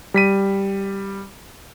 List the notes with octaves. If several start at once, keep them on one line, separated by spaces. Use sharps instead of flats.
G3 B6 D#7